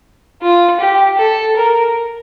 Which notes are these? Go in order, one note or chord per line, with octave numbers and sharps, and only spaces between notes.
F4
G4
A4
A#4